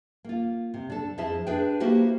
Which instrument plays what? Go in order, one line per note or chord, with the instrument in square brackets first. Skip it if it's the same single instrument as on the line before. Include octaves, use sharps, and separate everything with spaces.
[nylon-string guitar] A#3 F4
C3
D4 A4
F2 E4 G#4 D#5 E5 A5
D4 G#4 B4 G5
A#3 E4 F#4 G4 C5